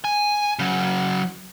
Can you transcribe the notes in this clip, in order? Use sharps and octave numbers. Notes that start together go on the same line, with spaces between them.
G#5
C#3 F#3